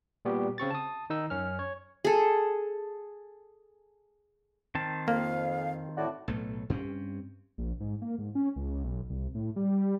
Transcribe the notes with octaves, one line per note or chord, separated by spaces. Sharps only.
A#2 G3 B3 F#4 G4
C#3 C4 C#6 A6
A5 D#6
D#3 D#4 E6
F#2 C#4 F6
C#5
G#4 A4
D#3 C4 A5
F2 A#3 F5
A2 F#4 D5
B1 A2 A3
G2 C4 C#4
A#1
G#2
A#3
G#2
C#4
C#2
B1
C2
A2
G3